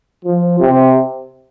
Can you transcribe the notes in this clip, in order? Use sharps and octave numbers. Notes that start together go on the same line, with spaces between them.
F3
C3